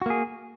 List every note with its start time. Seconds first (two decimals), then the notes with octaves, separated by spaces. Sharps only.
0.02 F#4
0.06 A#3
0.10 G#4